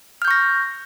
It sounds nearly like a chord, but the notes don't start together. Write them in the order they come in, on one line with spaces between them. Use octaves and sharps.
F6 G6 C#6 A#6